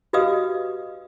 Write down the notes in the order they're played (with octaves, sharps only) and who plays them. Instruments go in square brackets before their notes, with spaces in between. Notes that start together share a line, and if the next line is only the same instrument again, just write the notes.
[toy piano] F#4 G4 B4 D#5 F5 D#6